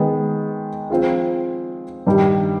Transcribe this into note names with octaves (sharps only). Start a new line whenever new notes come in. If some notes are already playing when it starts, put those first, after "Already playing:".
Already playing: D#3 G#3 B3
F3 C4 F4 G#4
G2 D#3 G3